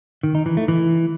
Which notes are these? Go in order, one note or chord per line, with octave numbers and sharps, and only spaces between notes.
D#3
D#4
E3
A3
E3